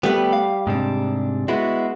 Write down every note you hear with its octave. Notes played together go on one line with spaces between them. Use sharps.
G3 A3 B3 B4
F5
G#2 C3 D4
G#3 B3 E4 F#4